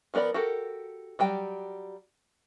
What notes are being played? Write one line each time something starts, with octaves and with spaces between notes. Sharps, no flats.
F3 B3 A#4 D5 B5
F#4 G4 A4 A#4
F#3 G3 G5